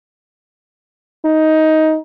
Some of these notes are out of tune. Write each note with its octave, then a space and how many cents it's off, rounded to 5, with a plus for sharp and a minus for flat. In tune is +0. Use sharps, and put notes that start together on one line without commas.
D#4 +15